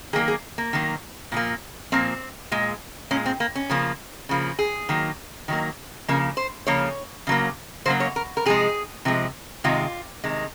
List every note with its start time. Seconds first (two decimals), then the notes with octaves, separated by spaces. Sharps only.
0.13 D#3 F#3 A#3 G#4
0.28 G#4
0.58 A#3
0.73 D#3 F#3 A#3
1.32 A#2 F3 A#3
1.92 A#2 F3 A#3 C4
2.52 A#2 G#3
3.11 A#2 G#3 C#4
3.26 C4
3.40 A#3
3.55 C#4
3.70 C#3 F3 A#3
4.29 C#3 F3 A#3
4.59 G#4
4.89 D#3 F#3 A#3
5.48 D#3 F#3 A#3
6.08 C#3 F3 A#3 A#4
6.37 C5
6.67 C#3 F3 A#3 C#5
7.27 C#3 F#3 A#3
7.86 C#3 F#3 A#3 C5
8.00 C#5
8.16 A#4
8.37 A#4
8.46 C3 F3 G#3 G#4
9.05 C3 F3 G#3
9.64 C3 D#3 G#3 F4
10.24 C3 D#3 G#3